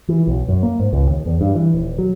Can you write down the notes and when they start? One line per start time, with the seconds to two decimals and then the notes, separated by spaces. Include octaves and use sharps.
0.09 E3
0.27 B1
0.48 F#2
0.63 A#3
0.80 G#2
0.93 C#2
1.09 D#2
1.25 E2
1.41 G2
1.55 E3
1.74 D#1
1.98 F#3